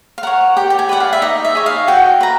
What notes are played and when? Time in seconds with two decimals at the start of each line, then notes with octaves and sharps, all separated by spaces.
0.18 F5
0.23 A#4 C#5 F#5
0.57 G4 G5
0.70 G5
0.79 G#5
0.89 B4 D5 F#5
1.00 F5
1.13 E5
1.22 D#4 D#5
1.45 E5
1.55 G#4 C#5
1.66 F5
1.88 F#4 G5
2.21 B4 A#5